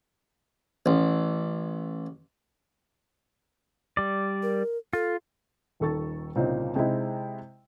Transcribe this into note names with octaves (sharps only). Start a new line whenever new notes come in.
A1
G3 D5
A#4
F4 A4
D#1 D#3 A4 C#6 A6
C2 A#2 C#3 C4 C#4 D#4
C3 G#3 C4 D#4 E4